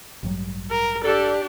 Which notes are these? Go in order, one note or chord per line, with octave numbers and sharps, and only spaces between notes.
A1 G2 F#3
A#4
D4 G4 A4